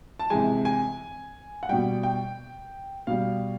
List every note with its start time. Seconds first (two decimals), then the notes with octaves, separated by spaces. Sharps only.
0.19 A5
0.30 C3 E3 G#3 G#5
0.65 G#5
1.63 F#5
1.69 B2 G3 G5
2.03 G5
3.07 B2 G3 F5